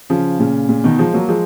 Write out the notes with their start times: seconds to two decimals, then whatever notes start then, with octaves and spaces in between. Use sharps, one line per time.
0.10 C#3 F3
0.39 A#2 C#3
0.69 A#2 C#3
0.84 B2 D#3
0.99 F3 G#3
1.13 F#3 A#3
1.28 F3 G#3